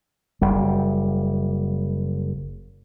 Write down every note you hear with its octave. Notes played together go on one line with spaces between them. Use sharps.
F#1 G3